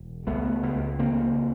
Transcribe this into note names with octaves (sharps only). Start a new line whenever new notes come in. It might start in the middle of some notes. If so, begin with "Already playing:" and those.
Already playing: E1
C#2 A3 B3
C#2
C#3 A#3 C4